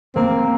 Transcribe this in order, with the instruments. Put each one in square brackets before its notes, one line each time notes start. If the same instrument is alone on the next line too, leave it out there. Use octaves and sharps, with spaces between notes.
[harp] A#3 [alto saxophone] C4